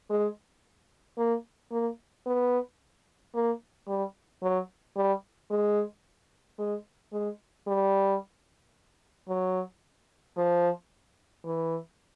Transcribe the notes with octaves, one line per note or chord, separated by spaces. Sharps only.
G#3
A#3
A#3
B3
A#3
G3
F#3
G3
G#3
G#3
G#3
G3
F#3
F3
E3